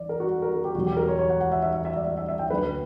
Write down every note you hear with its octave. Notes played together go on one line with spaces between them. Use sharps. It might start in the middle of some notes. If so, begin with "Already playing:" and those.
Already playing: E2 D5
A#4
F#4
A#4
A#4
G4
E1 E2 B2 F#3 F#4
G4
A#4
C#5
C#5
F#5
F#5
E5
E5
E5
E5
D5
E5
E5
E5
G5
D2 D3 F#3 A#3 D4 B4